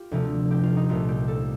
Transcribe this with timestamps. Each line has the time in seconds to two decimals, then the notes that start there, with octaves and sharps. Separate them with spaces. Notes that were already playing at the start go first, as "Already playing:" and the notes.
Already playing: F4 G4
0.11 D2 C3 F3 A3
0.51 G4
0.63 F4
0.76 D#4
0.89 C2 A#2 A3 F4
1.09 G4
1.28 A4